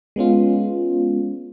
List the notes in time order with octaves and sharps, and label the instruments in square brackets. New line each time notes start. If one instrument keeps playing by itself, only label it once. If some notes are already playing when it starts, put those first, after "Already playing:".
[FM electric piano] G#3 B3 C#4 F4